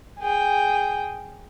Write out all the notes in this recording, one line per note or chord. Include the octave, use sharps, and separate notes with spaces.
G#4 G5